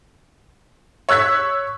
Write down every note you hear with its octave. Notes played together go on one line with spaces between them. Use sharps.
C#5 E6 F#6 G#6 B6